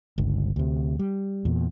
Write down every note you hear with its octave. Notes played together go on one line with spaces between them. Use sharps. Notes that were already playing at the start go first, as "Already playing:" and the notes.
G1 C#2
D2 C3
G3
E2 A#2